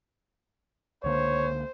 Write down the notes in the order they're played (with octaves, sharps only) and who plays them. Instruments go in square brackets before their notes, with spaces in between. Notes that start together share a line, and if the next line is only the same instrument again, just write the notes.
[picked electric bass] C#2 D3 A#3 [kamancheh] C5 [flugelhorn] C#5